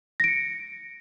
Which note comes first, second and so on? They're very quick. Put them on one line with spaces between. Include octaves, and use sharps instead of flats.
A#6 D7 C#7